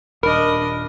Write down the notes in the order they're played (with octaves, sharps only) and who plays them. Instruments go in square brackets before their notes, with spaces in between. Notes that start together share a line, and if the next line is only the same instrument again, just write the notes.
[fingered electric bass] D#1 [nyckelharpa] D4 D#5 [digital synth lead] A#4 [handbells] B5